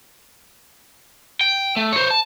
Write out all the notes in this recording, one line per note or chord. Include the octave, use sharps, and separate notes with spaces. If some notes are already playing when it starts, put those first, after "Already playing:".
G5
A3
C5 C#5
A5